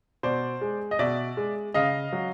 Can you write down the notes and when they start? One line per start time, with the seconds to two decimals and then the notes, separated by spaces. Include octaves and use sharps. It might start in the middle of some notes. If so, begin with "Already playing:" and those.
0.23 B2 C5 D5
0.61 G#3
0.91 D#5
0.99 B2 D5 E5
1.37 G#3
1.74 C#3 D#5 F5
2.13 F#3